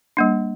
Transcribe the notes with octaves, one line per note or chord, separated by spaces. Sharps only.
G3 A#3 D4